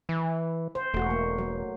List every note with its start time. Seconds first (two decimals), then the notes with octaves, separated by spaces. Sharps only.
0.09 E3
0.75 C5
0.94 E1 A3 F#4
1.10 A#3
1.38 F#3